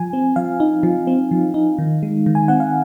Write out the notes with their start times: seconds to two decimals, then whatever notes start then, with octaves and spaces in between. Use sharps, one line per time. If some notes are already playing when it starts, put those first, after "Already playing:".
Already playing: F3 G#5
0.13 C4
0.36 F3 F5
0.60 D#4
0.83 F3
1.07 C4
1.31 F3
1.54 D#4
1.78 D#3
2.03 G#3
2.26 D#3
2.35 G#5
2.48 C4 F#5
2.60 F5